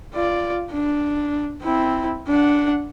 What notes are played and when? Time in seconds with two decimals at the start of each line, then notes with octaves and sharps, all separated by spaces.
0.14 F4 D5
0.72 D4
1.62 C4 E4
2.28 D4 F#5